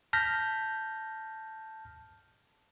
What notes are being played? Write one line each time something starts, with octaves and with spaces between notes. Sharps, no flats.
A5 F6 G6 A#6 B6